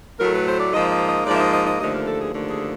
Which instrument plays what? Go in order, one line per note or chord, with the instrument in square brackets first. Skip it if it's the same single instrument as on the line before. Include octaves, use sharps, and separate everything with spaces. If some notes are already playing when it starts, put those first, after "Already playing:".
[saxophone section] A2 F#3 A3 A#4
B4
C5
D5
G#2 F3 A#3 D#5
D#5
D#5
G#2 F3 A#3 D5
E5
D#5
D#5
D#5
D#2 D3 F3 A3 D#5
A#4
A4
G#4
D#2 D3 F3 A3
G#4